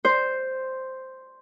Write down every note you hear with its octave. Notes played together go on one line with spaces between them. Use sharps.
C5